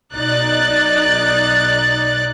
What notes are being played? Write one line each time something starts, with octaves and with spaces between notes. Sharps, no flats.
B1 D#4 D5 F#6 A6